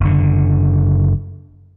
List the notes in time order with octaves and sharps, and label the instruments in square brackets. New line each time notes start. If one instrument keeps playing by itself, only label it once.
[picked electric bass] F#1 D3